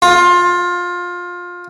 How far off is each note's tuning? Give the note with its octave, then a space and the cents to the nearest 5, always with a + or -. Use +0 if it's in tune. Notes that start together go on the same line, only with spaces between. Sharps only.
F4 +20